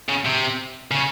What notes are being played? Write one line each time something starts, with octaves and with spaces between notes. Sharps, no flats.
C#3
C3
C#3